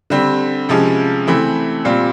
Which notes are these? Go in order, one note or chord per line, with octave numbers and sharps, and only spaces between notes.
D3 G3 C4
C3 F3 G#3 C#4
E3 A3 C4 E4
A#2 G3 C4 F4